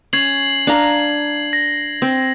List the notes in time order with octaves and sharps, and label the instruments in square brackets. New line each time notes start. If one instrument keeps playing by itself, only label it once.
[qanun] C#4 [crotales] G#6 C7 F#7
[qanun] D4 F5 A#5
[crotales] A#6
[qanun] C4